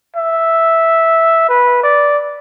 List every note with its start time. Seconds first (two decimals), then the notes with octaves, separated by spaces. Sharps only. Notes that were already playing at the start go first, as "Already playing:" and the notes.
0.16 E5
1.49 B4
1.83 D5